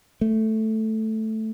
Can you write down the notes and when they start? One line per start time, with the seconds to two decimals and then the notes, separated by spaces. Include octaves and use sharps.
0.21 A3